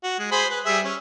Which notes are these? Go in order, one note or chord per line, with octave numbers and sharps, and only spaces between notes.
F#4
G#3
G#4 C5 B5
B4
G3 G#4 E5
C#4